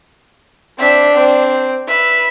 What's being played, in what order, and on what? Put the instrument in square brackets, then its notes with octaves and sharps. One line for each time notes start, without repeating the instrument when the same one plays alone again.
[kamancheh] C4 E5 [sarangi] D4
[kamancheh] C4
[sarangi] B4 [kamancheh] E5